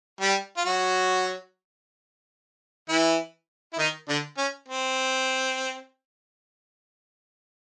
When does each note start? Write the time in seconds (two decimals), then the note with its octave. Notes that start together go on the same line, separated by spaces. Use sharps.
0.21 G3 G4
0.57 F4
0.65 F#3 F#4
2.89 E3 E4
3.73 E4
3.79 D#3 D#4
4.09 D3 D4
4.38 C#4
4.68 C4